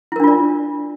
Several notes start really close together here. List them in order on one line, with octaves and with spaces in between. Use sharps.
E4 A#4 D4 F4 D5